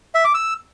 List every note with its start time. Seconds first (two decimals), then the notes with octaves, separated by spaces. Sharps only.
0.15 E5
0.24 D6
0.34 E6